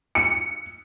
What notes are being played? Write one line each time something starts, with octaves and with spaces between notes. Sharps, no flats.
C#7